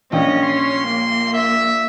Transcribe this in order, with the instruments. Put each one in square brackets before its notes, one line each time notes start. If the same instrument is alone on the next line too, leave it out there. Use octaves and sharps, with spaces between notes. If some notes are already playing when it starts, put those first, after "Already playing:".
[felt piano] A#1 G5 [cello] C#4 [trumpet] D#5
[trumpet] C6
[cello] A#3
[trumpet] E5